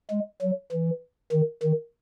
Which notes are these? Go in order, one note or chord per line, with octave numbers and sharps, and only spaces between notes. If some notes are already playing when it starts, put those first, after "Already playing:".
G#3
F#3
E3
D#3
D#3